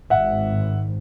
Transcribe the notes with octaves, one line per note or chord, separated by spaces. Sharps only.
G#1 E5 F#5